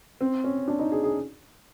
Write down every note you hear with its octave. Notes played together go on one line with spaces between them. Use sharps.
C4
C#4
D4
D#4
G#4
G#4